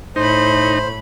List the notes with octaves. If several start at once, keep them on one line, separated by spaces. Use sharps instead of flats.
A2 D#4 C5 B5